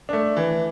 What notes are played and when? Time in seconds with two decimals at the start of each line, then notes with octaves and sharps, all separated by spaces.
0.09 A3 D4
0.37 E3